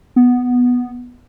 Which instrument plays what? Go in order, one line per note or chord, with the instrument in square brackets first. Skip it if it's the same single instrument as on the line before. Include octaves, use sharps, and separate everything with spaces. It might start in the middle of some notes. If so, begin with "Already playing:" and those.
[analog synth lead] B3